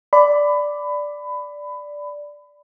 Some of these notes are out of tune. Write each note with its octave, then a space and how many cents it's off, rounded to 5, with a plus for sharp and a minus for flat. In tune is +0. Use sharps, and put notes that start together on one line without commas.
D5 +0 B5 +20